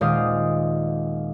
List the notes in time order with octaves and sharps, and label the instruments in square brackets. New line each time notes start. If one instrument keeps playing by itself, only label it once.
[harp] D#1 G#3 C5 D5 F5 D#6